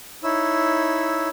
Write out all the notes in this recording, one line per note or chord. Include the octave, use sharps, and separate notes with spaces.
D#4 E4 C#5 E6